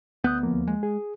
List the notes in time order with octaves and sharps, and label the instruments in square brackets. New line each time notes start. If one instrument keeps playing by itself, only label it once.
[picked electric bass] D2 B3 [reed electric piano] D#6 F#6 G6
[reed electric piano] D#2 F3 A#3
[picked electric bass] G#3
[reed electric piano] G#4